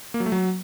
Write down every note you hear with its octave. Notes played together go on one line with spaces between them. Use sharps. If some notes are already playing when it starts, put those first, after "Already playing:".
A#3
F#3
A3
F#3